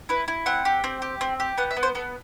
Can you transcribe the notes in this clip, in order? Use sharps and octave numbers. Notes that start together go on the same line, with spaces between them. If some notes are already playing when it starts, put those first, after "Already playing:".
E4 B4
E4
C4 F#5
G4
C4
G4
C4
G4
B3 F#5
E5
B3
C5
B3 A4